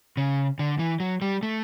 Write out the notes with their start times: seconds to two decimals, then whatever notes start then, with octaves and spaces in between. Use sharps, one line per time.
0.17 C#3
0.59 D3
0.79 E3
1.00 F#3
1.22 G3
1.43 A3